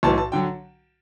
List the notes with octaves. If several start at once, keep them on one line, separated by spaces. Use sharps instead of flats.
B1 A2 E3 B3 A5
A5
D3 F#3 G5